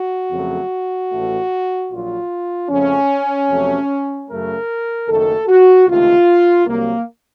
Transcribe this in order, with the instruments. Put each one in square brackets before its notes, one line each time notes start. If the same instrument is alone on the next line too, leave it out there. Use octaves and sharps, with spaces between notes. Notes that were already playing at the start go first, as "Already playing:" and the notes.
Already playing: [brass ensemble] F#4
F2 C#3 F#3 A3
A1 A2 A3
A#1 A#2 F#3 F4
F2 C#3 F3 A3 C#4
F2 C3 F#3 A3
F#2 C#3 A3 A#4
F#1 F#2 D#3 A3 A4
F#4
C#2 C3 D#3 A3 F4
C2 C3 F#3 A#3